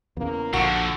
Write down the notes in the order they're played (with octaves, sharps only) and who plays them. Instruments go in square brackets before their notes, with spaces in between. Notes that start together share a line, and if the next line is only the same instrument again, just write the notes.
[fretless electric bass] E2 C#3 [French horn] A#3
[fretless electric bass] A#1 [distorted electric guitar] D3 F3 [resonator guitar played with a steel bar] F#4